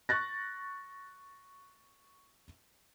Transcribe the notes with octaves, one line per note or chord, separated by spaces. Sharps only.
C#6 F#6 A6 A#6